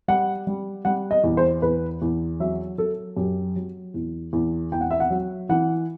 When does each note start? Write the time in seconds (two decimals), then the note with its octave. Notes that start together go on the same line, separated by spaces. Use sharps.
0.08 G3 F#5
0.47 G3
0.85 G3 F#5
1.11 D#5
1.24 E2
1.37 C5
1.62 E2 B4
2.02 E2
2.40 F#3 E5
2.78 F#3 A4
3.17 F#2 G4
3.56 F#3
3.94 E2
4.33 E2
4.72 E2 G5
4.81 F#5
4.91 E5
5.00 F#5
5.10 F#3
5.49 E3 F#5